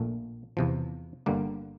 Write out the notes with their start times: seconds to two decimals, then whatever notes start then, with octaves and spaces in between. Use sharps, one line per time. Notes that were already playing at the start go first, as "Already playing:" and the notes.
Already playing: A#1 A#2 A3
0.57 E2 C3 F3
1.26 G1 G2 D3 G3 A#3